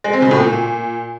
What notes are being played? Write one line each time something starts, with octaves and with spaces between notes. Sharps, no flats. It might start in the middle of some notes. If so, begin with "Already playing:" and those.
G#3
C4
C#3
A2
A#2